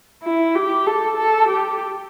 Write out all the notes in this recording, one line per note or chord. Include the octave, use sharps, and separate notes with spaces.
E4
G4
A4
A4
G4